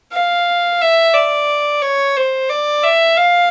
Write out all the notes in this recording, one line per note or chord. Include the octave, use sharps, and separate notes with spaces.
F5
E5
D5
C#5
C5
D5
E5
F5